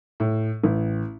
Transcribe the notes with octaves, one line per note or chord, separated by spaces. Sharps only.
A2
A1